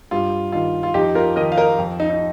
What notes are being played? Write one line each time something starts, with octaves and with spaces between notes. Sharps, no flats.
G2 F4
D#3 F4
F4
F2 D#4 G4
F4 A#4
D#3 A#4 D#5
F5
A#4 D#5
F2
D#4
D#4